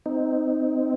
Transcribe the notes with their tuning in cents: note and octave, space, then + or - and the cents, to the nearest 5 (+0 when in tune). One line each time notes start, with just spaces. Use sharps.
C4 -20 D#4 +0